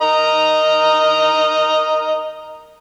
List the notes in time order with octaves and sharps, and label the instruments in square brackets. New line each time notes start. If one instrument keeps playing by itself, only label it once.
[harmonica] A#4 D#5 A#5